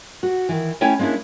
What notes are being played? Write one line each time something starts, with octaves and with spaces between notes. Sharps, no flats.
F#4
D#3 E3
A3 C#4 E4 C#5 G5 G#5
G#3 A#3 C#4 D4 E4